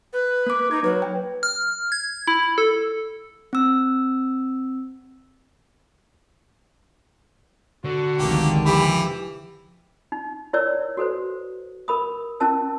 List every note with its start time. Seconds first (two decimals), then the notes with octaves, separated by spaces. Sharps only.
0.13 B4
0.46 A#3 D6
0.71 D#4 G#6
0.84 F#3 B4
1.02 G5
1.43 F6
1.92 G#6
2.28 E4
2.58 A4
3.53 C4 E6
7.85 D3 F#4
8.18 F1 C#2 D#3 A#3 G4
8.65 E3 F3 G4 B5
10.12 D#4
10.53 E4 A#4 C#5 D5 E6
10.97 F#4 A4 B4 C5
11.88 A#4 B5 D#6
12.40 C#4 E4 A#4 A5 E6